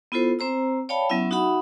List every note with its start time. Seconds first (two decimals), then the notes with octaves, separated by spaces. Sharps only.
0.12 B3 E4 F4 A4 C5
0.39 C4 C5 A#5 E6
0.89 C#5 D5 F5 G5 A5 B5
1.10 F#3 B3 C#4 E4 E5
1.31 D#4 F#4 E5 F#5 B5 D#6